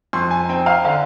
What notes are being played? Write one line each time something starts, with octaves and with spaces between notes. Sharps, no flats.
F2 C6
G#5
C4 G5
F5
D3 F5